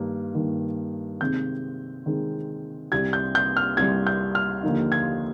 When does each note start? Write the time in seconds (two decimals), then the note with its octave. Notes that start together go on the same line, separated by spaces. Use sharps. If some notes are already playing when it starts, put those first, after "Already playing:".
Already playing: G2 D#3 A#3
0.35 G2 D#3 A#3
1.21 C3 D#3 G#3 C4 G6
2.06 C3 D#3 G#3 C4
2.92 C2 C3 G3 G#6
3.13 G6
3.35 G6
3.57 F6
3.77 C2 C3 G3 G#6
4.07 G6
4.35 F6
4.63 D#2 D3 F3 A#3 D#4
4.92 G#6